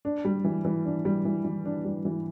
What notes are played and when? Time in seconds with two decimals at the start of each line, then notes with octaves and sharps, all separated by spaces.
0.05 D4
0.25 G3
0.44 E3
0.65 E3
0.85 D4
1.05 G3
1.25 E3
1.45 E3
1.65 D4
1.85 G3
2.05 E3